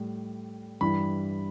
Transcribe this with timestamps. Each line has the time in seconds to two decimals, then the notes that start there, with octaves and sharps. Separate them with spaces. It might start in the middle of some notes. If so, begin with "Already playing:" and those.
Already playing: A2 G3
0.81 G2 E3 G3 B5